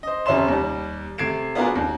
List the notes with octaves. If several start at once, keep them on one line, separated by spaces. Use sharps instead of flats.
C5 D#5
F2 C3 C#4 E5 C6 E7
D#2 G3
C3 A3 G#6 C7 D7 E7
B3 D4 F4 F#4 G#4 A#4
D#2